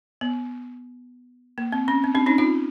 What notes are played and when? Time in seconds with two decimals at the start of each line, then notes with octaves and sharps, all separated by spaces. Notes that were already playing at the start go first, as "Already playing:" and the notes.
0.21 B3
1.58 A#3
1.72 C4
1.88 C#4
2.04 C4
2.15 C4 D4
2.26 C#4 D#4
2.38 D#4 F4